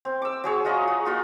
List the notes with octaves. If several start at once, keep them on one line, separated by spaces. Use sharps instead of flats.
C4
D6 E6
F#3 G#4 C#5
F4 F#4 D#5 A#5
F#4
A#3 F4 F#4